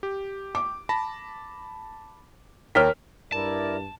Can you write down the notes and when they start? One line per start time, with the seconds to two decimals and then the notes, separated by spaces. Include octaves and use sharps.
0.03 G4
0.55 D6
0.89 A5 B5 A#6
2.75 D#2 A#4 C#5 G5 F6 B6
3.32 G2 E4 A#4 D5 A5